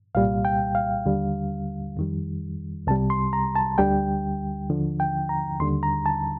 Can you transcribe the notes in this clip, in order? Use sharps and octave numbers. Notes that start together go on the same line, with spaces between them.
C2 A#2 G3 F5
G5
F5
D#2 D3 G3
F2 D#3 G3
C2 C3 G3 A5
C6
A#5
A5
D2 D3 G3 G5
D#2 D3 F3
G5
A#5
D#2 D3 G3 C6
A#5
A5